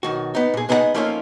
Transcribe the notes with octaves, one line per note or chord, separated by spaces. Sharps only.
B1 D#3 F#4
B3 D#4
A#2 G#4
G#3 B3 D#4 E4 D#5 F#5
F3 A3 A#3 C#4 D#4 F4